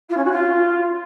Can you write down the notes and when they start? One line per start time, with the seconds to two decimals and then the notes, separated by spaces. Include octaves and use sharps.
0.09 F4
0.17 C#4
0.24 F#4
0.31 F4